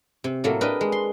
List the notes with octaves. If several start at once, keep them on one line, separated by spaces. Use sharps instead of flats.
C3
A2 F#3 A3 A#3
D4 G4 A#4 B4 D#5
G#3
C6